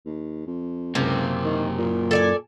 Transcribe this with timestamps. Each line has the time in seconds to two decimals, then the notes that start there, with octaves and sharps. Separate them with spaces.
0.06 D#2
0.47 F2
0.95 C#2 F#2 C3 A#3
1.44 D#3
1.78 A#2
2.11 A4 D5 G#5